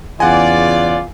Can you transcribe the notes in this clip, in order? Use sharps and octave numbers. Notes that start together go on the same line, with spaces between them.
E2 C#3 F4 D5 F#5 G#5